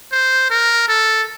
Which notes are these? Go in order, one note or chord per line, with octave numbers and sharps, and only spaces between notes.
C5
A#4
A4